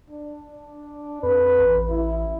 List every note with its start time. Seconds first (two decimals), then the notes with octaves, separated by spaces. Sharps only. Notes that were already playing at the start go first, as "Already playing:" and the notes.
0.10 D4
1.23 F2 B4
1.59 A1
1.90 E4